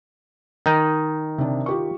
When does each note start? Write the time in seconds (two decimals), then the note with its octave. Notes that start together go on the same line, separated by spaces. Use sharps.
0.66 D#3 D#4
1.38 C3 D4
1.66 F4 G4 C#6